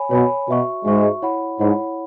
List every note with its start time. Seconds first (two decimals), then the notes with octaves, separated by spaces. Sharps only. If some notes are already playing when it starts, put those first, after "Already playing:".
Already playing: C#5 G#5 B5
0.11 B2 C#5 G#5 B5
0.48 B2 F#4 E5 C#6
0.85 G#2 G#3 F#4 E5 C#6
1.22 E4 C#5 F#5 B5
1.60 G#2 E4 C#5 F#5 B5